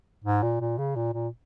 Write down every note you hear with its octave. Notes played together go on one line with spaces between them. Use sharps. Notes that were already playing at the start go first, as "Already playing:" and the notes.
G#2
A#2
A#2
C#3
A#2
A#2